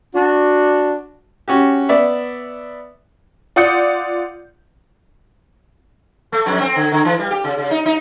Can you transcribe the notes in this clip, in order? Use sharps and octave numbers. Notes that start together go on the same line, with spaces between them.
D4 F#4
C#4 F#4 G4
B3 D5 E5
F4 D5 F#5 D#6 G6 C#7
A3
F2
C4
D3
D3
E3
G3
G4
C#3
C#3
D#4
D#4